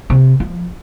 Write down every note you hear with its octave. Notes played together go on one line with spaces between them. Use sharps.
C3
F3